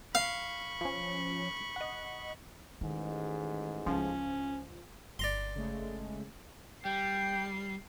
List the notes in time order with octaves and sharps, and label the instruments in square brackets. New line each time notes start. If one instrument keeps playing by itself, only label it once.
[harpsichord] F5 [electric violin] B5 C#6
[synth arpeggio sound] F3 C#4
D#5 F#5
[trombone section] A1 G#2 G#3 [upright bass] D#3
[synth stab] C#2 F3 [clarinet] C#4 [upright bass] D4
[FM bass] G1 [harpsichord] D5 A#5 C6
[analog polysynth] C#3 G#3 A3
[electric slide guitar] G3 [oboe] G5 [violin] C7